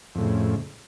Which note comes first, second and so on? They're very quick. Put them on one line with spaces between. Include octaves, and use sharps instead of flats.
F2 A2 C#3